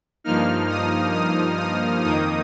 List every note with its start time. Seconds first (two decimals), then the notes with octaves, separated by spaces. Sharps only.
0.24 G2 F3 A#3 D#4 F6
0.69 D#6
1.14 D#6
1.58 D#6
2.03 F2 D#3 A#3 D#4 D#6